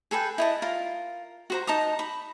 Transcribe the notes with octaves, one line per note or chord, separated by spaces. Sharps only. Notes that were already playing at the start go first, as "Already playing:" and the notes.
G#4 A4 B4 G5
E4 D#5 A5
F4 A#4
F#4 C5 A#5
D#4 A5 A#5 D#6
B5